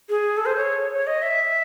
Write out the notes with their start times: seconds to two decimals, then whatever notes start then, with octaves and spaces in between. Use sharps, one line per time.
0.09 G#4
0.37 A4
0.46 C5
0.56 C#5
0.93 C#5
1.07 D#5
1.22 E5